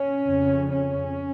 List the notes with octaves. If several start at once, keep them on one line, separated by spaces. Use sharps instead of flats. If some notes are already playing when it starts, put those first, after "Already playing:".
Already playing: C#4
F2 C#3
C#4